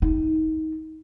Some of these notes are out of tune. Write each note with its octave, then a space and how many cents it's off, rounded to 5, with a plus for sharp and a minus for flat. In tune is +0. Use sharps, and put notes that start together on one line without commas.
D#4 +20